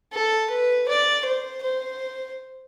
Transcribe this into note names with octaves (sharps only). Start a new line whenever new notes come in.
A4
B4
D5
C5
C5